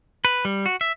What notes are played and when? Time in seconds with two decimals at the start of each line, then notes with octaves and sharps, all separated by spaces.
0.25 B4
0.45 G3
0.66 F#4
0.81 E5